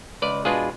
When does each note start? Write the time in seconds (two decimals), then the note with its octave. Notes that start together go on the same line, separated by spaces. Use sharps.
0.22 C#2 B4 D5
0.45 B2 G#3 D4 F4 G#4 B4